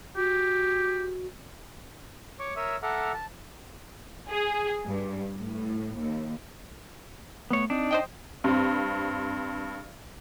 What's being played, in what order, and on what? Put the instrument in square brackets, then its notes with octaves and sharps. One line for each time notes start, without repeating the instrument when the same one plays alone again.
[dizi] F#4 [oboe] G4
[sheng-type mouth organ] C#5 C#6 D6
A#4 C#5 E5 D#6 E6
A4 E5 F#5 A#5 D6 F6
A5
[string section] G#4
G2
A2
D#2
[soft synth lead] A3 [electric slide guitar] B3 C#5
[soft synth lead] C4 [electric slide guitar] D4 D#4
[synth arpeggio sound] C5 D#5 G5
[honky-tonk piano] G2 C4